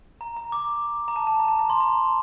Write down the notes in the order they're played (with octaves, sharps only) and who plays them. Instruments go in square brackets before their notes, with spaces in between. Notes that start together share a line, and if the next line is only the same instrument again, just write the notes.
[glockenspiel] A#5
A#5
D6
A#5
A5
A5
A#5
A5
A#5
C6
A#5